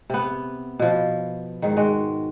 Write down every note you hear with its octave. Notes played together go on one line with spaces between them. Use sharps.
C3 B3
B2 F3
G#2 D#3
G#3 F#4